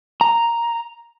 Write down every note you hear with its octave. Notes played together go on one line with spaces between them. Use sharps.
A#5